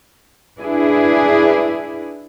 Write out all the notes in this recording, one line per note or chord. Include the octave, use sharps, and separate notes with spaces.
D4 E4 G#4 B4